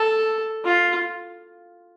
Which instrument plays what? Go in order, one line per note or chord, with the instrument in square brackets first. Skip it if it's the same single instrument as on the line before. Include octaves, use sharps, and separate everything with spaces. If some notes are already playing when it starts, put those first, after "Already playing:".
Already playing: [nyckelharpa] A4
F4